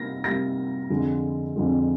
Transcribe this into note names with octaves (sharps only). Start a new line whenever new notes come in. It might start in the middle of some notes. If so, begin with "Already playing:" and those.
Already playing: C3 G3 A#3 A#6
C3 G3 A#3 A#6
F2 D3 G#3
F2 D3 G#3